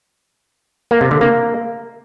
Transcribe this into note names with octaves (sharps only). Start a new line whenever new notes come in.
A#3
C3
D3
A#3